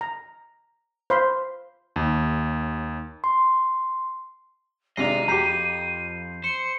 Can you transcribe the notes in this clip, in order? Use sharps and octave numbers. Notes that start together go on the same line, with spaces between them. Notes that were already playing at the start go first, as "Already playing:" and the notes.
A#5
C5 F5 B5 C6
D#2
C6
G#1 C3 D4 D#5 A#5 C7 D#7
F2 G4 A#5 B5 G6 C7
C5 C#7